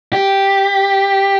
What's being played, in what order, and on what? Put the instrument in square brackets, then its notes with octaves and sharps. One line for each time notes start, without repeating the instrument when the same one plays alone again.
[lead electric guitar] G4